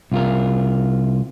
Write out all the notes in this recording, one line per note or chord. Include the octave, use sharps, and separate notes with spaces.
C2 F4 A#4